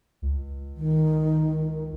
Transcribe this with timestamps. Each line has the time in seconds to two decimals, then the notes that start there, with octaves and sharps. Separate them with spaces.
0.22 C#2
0.77 D#3